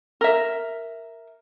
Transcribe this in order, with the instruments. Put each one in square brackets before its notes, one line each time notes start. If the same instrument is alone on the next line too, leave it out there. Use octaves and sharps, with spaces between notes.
[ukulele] A#4 E5